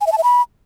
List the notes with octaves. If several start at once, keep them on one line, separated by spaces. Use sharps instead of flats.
G#5
E5
A5
E5
B5